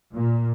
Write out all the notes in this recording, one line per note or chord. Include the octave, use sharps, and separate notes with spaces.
A#2